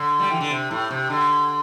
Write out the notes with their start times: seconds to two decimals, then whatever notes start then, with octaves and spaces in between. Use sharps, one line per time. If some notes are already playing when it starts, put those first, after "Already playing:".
Already playing: D3
0.20 G3
0.30 E3
0.41 D3
0.51 C3
0.71 A2
0.91 C3
1.10 D3